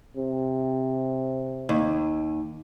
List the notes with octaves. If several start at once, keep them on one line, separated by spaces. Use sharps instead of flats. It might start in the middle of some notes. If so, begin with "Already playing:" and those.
C3
D#2